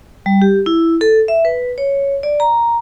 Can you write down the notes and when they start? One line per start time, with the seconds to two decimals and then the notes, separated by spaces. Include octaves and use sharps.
0.26 G3
0.42 G4
0.66 E4
1.01 A4
1.28 E5
1.45 B4
1.78 C#5
2.23 D5
2.40 A#5